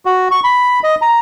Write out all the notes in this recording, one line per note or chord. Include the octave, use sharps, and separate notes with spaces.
F#4
C#6
B5
D#5
A#5